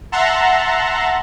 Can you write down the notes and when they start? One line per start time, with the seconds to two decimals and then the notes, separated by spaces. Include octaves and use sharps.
0.12 E5 F#5 A5 A#5 C6